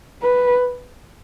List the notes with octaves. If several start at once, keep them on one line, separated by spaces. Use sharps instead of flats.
B4